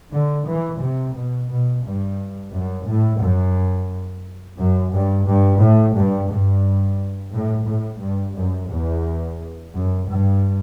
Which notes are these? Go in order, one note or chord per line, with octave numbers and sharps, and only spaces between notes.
D3
E3
C3
B2
B2
G2
F#2
A2
F#2
F#2
G2
G2
A2
G2
G2
A2
A2
G2
F#2
E2
F#2
G2